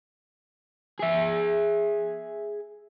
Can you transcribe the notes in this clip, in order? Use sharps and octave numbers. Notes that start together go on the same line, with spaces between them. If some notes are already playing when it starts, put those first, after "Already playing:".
G#4 E5